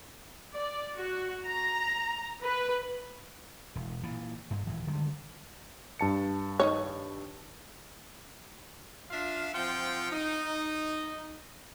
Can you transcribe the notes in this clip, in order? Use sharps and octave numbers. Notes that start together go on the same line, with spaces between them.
D5
F#4
A#5
B4
E1
A#2 E3
G2
D#1 E3
D3 D#3 G3 G#3
G2 A5 C#7
D#3 D#4 C#5
D4 F4 E5 F5
F3 C4 F4 F#5 G5
D#4